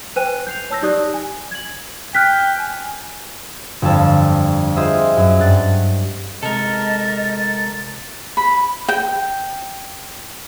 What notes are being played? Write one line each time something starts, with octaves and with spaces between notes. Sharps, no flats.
B4 C5 G5 G#5 F#6 D#7
G6 C7 F7
C#5 A5 E6 G6 A#6
D#4 G4 D5 D#6 F#6
G#5
G#6 F#7
G5 F6 F#6 B6
G#5
G1 F2 F5 A5 E6
F4 G#4 C5 D#5 E5
F#2
G2 F#6 A6
C3 G#3 A4 A#4 D#5 A6
B5
G5